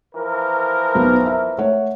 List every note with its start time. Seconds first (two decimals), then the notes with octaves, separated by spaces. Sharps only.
0.14 E3 F3 A#4
0.95 B1 B3 B4
1.26 E5
1.58 A3 C#5 F#5